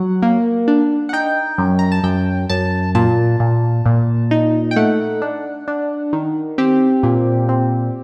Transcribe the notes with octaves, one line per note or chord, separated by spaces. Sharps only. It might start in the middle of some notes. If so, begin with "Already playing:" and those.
Already playing: F#3 F#5
A#3
D4
F#5
D#4 G5
F#2
A#5
A5
F#2 G5
F#2 A5
A#2 A5
A#2
A#2
D#4
G5
A3 F#5
D4
D4
D#3
C4 G4
A#2
C4